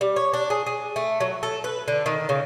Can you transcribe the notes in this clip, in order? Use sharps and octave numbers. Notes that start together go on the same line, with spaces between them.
G3
C#5
D4
G#4
G#4
A3
F#3
A4
B4
D3
D#3
C#3